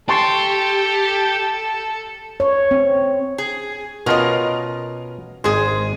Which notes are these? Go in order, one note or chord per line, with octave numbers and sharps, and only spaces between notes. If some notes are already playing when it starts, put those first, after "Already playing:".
G4 A4 A5 C6 C#6
C#5
C4
G#4
B2 C#4 F4 A#4 D#5
G#1 G#3 G#4 C5